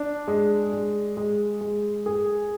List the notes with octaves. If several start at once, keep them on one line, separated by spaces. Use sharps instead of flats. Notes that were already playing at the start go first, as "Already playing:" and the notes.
Already playing: D4
G#3
G#3
G#3
G#3
G#4